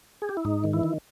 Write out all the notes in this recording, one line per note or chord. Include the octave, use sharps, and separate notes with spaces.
G#4
G4
E4
G#2 D#4
D#3
E3 E4
D#3